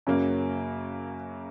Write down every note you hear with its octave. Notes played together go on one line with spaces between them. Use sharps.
F#2 C#3 F#3 A#3